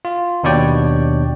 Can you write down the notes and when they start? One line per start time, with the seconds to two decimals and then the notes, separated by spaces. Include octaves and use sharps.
0.05 F4
0.44 D#2 B2 D4 C#5 D5 G5